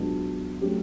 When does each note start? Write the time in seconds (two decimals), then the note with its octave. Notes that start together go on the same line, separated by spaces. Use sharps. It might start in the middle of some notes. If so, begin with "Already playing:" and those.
Already playing: C#2 B2 F#3 B3 D4
0.61 F#3 A3 C#4 G4